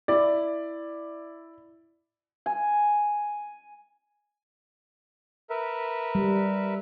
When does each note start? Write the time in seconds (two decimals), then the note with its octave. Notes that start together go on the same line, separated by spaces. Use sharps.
0.08 E4 D5
2.46 G#5
5.50 A#4 B4 E5
6.15 G3